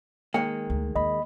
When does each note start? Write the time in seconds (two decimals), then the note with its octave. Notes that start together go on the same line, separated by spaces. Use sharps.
0.34 D#3 G#3 A#3 G5
0.70 D2
0.96 D#2 D#5 B5